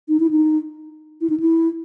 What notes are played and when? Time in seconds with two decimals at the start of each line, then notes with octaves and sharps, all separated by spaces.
0.09 D#4
0.20 E4
0.31 D#4
1.21 E4
1.30 D#4
1.40 E4